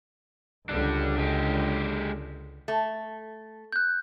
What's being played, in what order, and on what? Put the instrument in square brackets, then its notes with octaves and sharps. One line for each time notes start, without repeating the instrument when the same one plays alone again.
[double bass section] C#2 D3 [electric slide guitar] G3 D4
[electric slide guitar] G#3 G4
[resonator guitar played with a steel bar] A3
[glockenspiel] F#6 G6